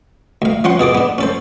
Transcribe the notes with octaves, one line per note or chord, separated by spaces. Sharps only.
D2 F5
F3 C#4 F#5 C6
B2 G#4 A4 D6
B3 D4
C#4 A4 C5